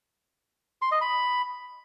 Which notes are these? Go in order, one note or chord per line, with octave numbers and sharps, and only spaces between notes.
C6
D#5
B5